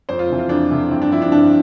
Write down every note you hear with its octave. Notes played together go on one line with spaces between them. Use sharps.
F2 C5
F4
C3 E3
F4
F2 D4
C3 E3
G2 C4
D4
F3 E4
D4
G2 D4